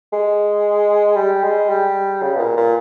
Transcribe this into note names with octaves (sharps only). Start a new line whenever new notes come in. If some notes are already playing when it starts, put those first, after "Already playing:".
G#3
G3
G#3
G3
C#3
B2
A#2
A#2